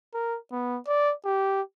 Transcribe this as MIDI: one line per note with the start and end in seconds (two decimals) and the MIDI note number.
0.14 0.38 70
0.52 0.79 59
0.87 1.13 74
1.25 1.62 67